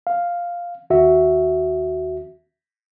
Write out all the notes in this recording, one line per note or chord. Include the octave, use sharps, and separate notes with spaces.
F5
D#2 F#4 E5